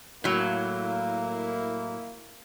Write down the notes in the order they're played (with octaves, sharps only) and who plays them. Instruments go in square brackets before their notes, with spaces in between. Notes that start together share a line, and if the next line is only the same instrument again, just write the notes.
[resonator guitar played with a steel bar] A2 F#3 [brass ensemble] A#3 E4